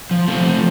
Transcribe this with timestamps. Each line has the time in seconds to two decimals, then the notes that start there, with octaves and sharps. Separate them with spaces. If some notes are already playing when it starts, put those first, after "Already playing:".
0.11 F3
0.28 F3 A3 C4
0.45 F3